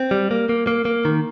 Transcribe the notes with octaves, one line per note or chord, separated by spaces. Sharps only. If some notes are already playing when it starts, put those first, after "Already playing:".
Already playing: C4
G3
A#3
A#3
A#3
A#3
D#3